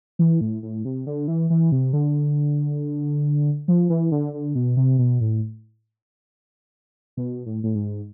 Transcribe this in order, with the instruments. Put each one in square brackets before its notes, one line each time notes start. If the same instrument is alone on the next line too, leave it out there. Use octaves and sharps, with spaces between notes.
[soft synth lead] E3
A2
A2
C3
D3
E3
E3
C3
D3
F3
E3
D3
D3
B2
C3
B2
A2
B2
A2
A2
G#2